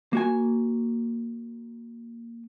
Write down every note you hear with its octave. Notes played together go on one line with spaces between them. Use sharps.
A#3 F#4 G#5